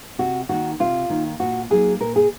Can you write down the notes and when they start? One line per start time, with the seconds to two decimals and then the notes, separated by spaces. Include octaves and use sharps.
0.18 C3 F#4
0.49 D#3 A#3 D#4 F#4
0.80 C3 F4
1.10 D#3 A#3 D#4
1.40 A#2 F#4
1.70 F#3 A#3 D#4 G#4
2.01 A#2 A#4
2.16 G#4